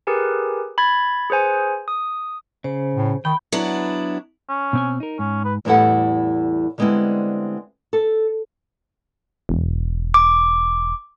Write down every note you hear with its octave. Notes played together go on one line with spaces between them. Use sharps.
G4 G#4 A#4 B4 G#5
B5 G#6 A6
G#4 B4 C5 G#5
D#6
C#3 C5
A2
D#3 G5 B5
F#3 B3 D4 E4
C#4
B2 C4 G#5
D#4 A#4
G#2 C#4
B4
E2 A2 G3 E4 A4 F#5
D3 G3 G#3 B3 C4 E4
A4
E1
D6